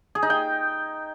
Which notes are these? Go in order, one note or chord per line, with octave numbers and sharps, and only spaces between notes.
G#4
D#4
G5